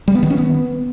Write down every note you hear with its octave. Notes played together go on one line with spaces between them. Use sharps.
G3
B3
D#3
C#4
B3